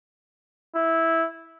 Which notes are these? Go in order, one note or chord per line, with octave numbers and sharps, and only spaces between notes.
E4